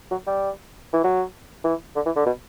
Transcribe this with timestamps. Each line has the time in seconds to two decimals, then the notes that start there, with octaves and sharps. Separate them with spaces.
0.11 F#3
0.27 G3
0.93 E3
1.04 F#3
1.65 E3
1.96 D3
2.06 E3
2.16 D3
2.26 B2